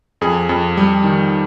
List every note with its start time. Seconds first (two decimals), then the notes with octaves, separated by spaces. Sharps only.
0.21 F2 G#4
0.49 F2
0.77 G3
1.04 D#3